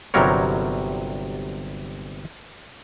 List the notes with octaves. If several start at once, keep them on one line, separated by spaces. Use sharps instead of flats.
G1 C3 F#3 G3 A#4 C#5